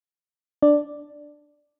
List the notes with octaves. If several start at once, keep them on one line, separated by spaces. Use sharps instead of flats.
D4 D5